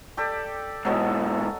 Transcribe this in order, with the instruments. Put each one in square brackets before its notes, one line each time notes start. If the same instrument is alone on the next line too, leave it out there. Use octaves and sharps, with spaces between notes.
[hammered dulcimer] G4 A4 D5
[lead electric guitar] G#2 B2 [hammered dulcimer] F#3 A4 D#5